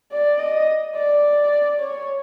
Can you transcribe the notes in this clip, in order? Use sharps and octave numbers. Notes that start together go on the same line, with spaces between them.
D5
D#5
D5
C#5